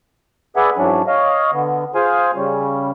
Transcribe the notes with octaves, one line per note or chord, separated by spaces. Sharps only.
G#4 B4 D5 E5 F#5 G#5
G#2 E3 F#3 C#4 D4
C#5 D#5 F5
D3 B3
F4 G#4 C5 F5 G#5
C#3 G3 C#4